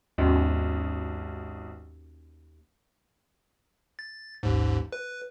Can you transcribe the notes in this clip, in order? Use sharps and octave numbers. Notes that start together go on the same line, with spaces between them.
G#1 D#2 B2 C#4 F#4 D#5
A6
A1 D#2 G#2
B4